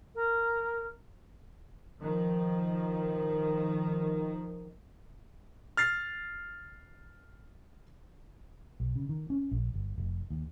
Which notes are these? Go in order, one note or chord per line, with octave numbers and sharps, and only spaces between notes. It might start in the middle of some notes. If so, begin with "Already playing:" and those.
A#4
D#3 F3
F6 A6 C7
B1
C#3
D#3
C#4
A#1
G1
F1
D#2